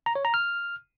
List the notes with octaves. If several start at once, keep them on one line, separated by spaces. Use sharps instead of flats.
A#5
C#5
A#5
F6